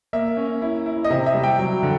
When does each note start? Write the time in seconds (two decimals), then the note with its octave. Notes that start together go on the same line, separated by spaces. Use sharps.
0.13 A#3 E5
0.37 C#4
0.62 E4
0.86 E4
1.04 D#5
1.10 C3 E5
1.26 E5
1.34 G3
1.43 G5
1.59 F#3
1.83 D3